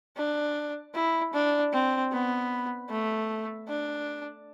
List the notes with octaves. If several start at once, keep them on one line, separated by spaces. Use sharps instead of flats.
D4
E4
D4
C4
B3
A3
D4